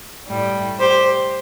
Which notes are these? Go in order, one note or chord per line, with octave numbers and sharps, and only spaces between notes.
A2 G3
G4 C5